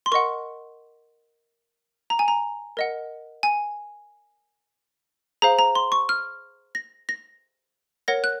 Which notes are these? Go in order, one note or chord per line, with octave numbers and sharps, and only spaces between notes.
C6
A#4 D#5 F#5 C#6
A#5
G#5
A#5
A#4 D#5 F#5
G#5
G#4 C5 F5 A#5
A#5
C6
C#6
F6
A#6
A#6
A#4 C#5 F#5 A#6
F#6